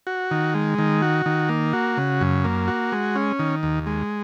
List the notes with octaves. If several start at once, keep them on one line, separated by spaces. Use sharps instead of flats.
F#4
D#3
G#3
D#3
F#4
D#3
A#3
F#4
C#3
F#2
A#3
F#4
G#3
C#4
D#3
D#2
G#3